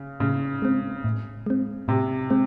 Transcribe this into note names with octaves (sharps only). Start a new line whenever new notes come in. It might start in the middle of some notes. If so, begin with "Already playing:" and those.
Already playing: C#3
A2 C#3
G#3 C4
A2
G#3 C4
A2 C3
G#3 C4